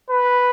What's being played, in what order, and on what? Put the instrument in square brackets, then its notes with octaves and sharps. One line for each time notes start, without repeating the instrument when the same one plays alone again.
[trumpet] B4